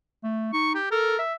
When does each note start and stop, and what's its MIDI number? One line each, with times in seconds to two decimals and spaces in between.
0.23 0.49 57
0.53 0.77 63
0.53 0.74 85
0.75 0.86 67
0.91 1.17 69
0.91 1.19 70
1.19 1.34 76